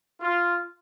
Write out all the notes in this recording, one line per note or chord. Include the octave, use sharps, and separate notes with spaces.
F4